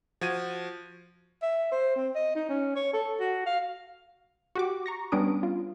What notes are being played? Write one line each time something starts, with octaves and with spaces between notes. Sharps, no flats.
F3 F#4 G#6 D#7
E5
C5
C4
D#5
D#4
C#4
C#5
A4
F#4
F5
F#4 G4 D6
A#5 C#6 A#6
G3 B3 C#4 D4 D#6 D7
F4